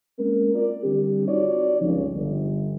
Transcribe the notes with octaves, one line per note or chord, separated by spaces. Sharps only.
G#3 A#3 C4 C#4 A#4
F4 A#4 D5
D3 G3 C4 D4 G4
C4 D#4 F4 F#4 C#5 D5
G1 C#2 C#3 F3
G1